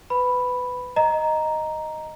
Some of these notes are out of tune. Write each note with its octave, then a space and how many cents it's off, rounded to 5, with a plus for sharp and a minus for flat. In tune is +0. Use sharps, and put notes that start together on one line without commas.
B4 +20 B5 +0
D#5 +0 A#5 +0